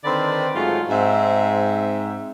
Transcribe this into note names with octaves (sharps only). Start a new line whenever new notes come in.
D3 D#3 C4 B4 C5 D5
G#2 F#3 G#3 A3 F4
G#2 C4 E5